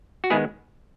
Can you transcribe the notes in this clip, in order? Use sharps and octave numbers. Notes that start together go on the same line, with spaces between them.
F#4
D#3 G#3 B3 E4 G#4